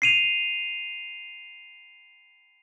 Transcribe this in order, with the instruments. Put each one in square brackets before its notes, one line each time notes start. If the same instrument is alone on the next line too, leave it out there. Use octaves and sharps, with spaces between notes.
[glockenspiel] C7 D#7 F7